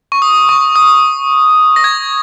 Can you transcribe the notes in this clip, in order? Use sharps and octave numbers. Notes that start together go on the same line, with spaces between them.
C#6
D#6
C#6
D#6
A#6
G#6